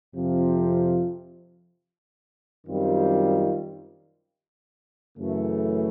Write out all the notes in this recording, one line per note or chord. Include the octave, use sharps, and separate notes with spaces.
F2 C3 F3
F#2 D#3 G3 C4 F4
F#2 C#3 E3 A3